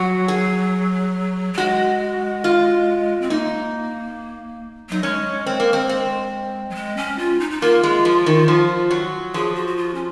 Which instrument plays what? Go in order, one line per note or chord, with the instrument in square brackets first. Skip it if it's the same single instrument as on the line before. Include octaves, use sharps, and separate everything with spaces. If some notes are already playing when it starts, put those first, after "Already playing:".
Already playing: [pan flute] F#3 [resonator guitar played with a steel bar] F#4
[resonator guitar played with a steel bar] G#4
[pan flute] F#3
[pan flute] G#3 [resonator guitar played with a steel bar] F#4
[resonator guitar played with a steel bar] F4
[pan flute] C4
[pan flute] A#3 [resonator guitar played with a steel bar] D#4
[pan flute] F#3 [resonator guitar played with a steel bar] D#4
[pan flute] G#3 [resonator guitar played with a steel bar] C#4
[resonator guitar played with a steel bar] C4
A#3
C4
C4
[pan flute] F#3
G#3
C#4
F4
D#4
D#4
[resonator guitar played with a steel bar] A#3 [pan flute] F4
[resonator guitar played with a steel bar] G#3
F3
D#3
F3
F#3
[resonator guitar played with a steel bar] F3 [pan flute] G#4
[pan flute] F#4
F#4
F4
C#4